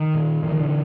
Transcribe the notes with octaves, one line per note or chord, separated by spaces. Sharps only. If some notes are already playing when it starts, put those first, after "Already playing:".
Already playing: D#3
A#2
A#2 E3
D#3
D3 E3